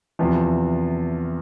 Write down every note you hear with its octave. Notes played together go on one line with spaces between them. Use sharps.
E2 C3 F3